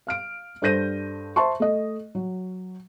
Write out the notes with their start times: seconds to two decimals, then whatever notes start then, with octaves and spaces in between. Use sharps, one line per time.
0.07 F5 F6 D7
0.62 G2 A4 C5 G6 A#6 D#7
1.36 C5 E5 A5 C6 C#6
1.60 A3 D#5
2.15 F#3